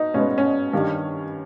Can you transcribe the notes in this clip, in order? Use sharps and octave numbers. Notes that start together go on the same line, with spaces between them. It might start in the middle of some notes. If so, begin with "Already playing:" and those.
Already playing: B2 D#4
B2 G#3 B3 C#4
C#4
G2 D#3 G3